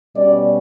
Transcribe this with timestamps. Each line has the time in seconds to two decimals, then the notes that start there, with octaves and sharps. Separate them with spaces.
0.16 B2 G3 C#4 D5